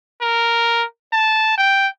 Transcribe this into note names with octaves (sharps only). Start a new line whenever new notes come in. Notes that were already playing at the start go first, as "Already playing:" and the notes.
A#4
A5
G5